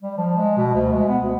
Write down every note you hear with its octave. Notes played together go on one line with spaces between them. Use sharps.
G3
F3
G#3
B2
D2
G#3
B3
D2